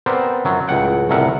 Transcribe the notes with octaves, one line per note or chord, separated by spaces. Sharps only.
B3 C4 A#4 C5 D5
F#2 F#3 F4
C#2 A2 F#5 G5
C2 F2 A2 A#4 E5 F#5